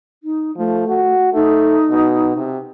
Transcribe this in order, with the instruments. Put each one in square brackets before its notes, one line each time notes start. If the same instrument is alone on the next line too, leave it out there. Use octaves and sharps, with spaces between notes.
[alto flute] D#4
[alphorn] F3 [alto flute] A3
[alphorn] F#4
[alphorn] A3 [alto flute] D#4
[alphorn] B2
C3